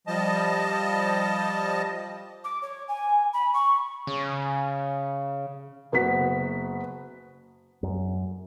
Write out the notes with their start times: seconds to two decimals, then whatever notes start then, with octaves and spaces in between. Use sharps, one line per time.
0.07 F3 G3 D#5 A5
2.44 D6
2.62 C#5
2.88 G#5
3.33 B5
3.54 C#6
4.07 C#3
5.92 F#1 B3 F#4 B6
7.83 F#2